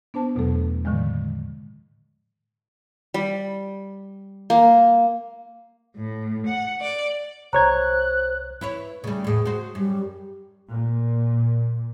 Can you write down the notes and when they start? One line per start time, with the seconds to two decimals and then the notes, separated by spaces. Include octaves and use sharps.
0.14 B3 D4 C5 A5
0.35 E2 B2 F#3 A3 A4
0.85 A2 D3 D#3 F3 G#3
3.14 G3
4.50 A#3
5.96 A2
6.46 F#5
6.81 D5
7.53 C2 C5 C#5 A#5 F#6 G#6
8.61 E4 B4 C#5
9.04 C#3 G3 A3
9.24 E2 A2 G#4
9.45 F#4 C5
9.75 F#2 G3
10.70 A#2